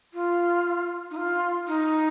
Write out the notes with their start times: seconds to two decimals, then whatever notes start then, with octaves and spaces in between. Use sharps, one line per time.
0.14 F4
1.11 D#4
1.17 F4
1.67 D#4